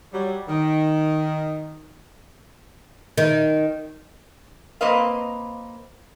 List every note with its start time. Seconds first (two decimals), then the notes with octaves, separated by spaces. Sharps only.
0.13 F#3 G3
0.49 D#3
3.18 D#3
4.81 A#3 C4 B4 D#5 F5